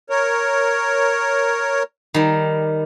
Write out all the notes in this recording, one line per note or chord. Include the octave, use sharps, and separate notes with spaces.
A#4 C#5
D#3 G3